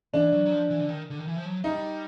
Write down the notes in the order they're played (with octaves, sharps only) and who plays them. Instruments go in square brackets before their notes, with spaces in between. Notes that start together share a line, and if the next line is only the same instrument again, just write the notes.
[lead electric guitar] E3 [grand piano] D4
[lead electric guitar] F#3
F#3
F3
E3
D3
D#3
D3
D#3
E3
F3
F#3
[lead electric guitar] G3 [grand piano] D#4